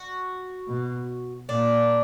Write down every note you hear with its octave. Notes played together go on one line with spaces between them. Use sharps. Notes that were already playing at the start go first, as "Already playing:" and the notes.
Already playing: F#4
B2
A#2 D4